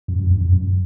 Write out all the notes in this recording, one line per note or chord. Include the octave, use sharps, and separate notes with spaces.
F#2
F#2
F#2
F#2
F#2